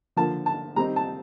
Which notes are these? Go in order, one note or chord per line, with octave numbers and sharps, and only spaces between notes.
D3 F3 A#3 A5
A5
D#3 G3 C4 D#4 A#5
A5